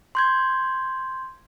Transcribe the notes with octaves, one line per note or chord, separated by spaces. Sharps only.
C6 G6 G#6